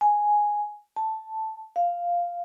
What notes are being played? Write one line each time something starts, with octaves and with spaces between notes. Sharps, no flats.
G#5
A5
F5